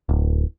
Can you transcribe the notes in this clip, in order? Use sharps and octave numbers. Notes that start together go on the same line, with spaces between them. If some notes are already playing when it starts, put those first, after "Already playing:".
D1